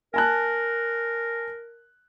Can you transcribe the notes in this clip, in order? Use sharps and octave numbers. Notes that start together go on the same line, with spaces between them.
A#4 G#5 A5 F#6